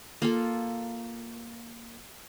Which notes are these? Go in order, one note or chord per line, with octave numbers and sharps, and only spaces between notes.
A#3 F4 A4